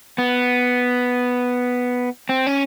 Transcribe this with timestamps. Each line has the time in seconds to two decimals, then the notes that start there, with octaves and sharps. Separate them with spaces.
0.18 B3
2.29 C4
2.47 C#4